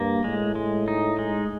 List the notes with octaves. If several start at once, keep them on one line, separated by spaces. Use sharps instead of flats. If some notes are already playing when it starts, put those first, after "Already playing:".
Already playing: G2 A#3
A2 G#3
G#3
D#4
G#3